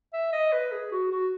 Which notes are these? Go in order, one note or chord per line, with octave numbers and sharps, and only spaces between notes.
E5
D#5
B4
G#4
F#4
F#4